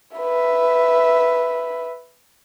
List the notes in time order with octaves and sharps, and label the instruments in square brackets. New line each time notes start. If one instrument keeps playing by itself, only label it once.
[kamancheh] B4 E5